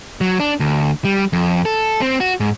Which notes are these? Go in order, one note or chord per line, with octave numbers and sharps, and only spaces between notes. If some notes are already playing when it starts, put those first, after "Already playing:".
F#3
D4
D2
G3
F2
A4
C4
F#4
G#2